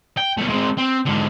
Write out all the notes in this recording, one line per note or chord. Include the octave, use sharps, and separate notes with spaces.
G5
B1 A3
G#3 C4
C4
G#2 D3